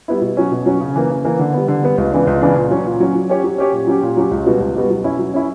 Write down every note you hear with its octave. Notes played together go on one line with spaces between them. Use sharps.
G3 B3 E4
B2
F#3 C#4
B2
F#3 C#4
C#3
E3 A#3
C#3
E3 A#3
D3
G3 B3
D3
G3 B3
C#2
C#3 E3 B3 D4
C#2
C#3 E3 B3 D4
A#2
F#3 C#4
A#2
F#3 C#4
F#3
C#4 G4 C#5
F#3
C#4 G4 C#5
A#2
F#3 C#4 G4
A#2
F#3 C#4 G4
C#2
B2 G3 B3 F#4
C#2
B2 G3 B3 F#4
F#3
C#4 E4
F#3
C#4 E4